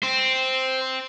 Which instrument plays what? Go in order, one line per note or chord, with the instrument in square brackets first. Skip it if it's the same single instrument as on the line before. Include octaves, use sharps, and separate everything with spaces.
[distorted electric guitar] C4 [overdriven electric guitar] C5